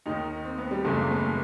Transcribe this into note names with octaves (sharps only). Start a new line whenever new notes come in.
D#2 D#3 D#4
C4
B3
G3
F#1 E2 C#3 E3 A3
A#3
B3
A#3